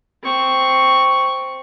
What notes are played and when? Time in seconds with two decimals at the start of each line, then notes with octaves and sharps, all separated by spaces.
0.23 C4 C#6